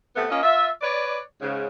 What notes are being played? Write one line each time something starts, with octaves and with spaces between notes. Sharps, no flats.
C3 A3 B3
A#3 C#4 F4 D#5
F4 E5
B4 C#5 D5
G#2 C#3